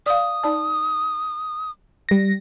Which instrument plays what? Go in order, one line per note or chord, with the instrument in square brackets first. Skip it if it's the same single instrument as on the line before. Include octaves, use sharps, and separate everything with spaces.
[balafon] D5 F5 [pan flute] D#6
[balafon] D#4 D5 A5
[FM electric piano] G3 A#6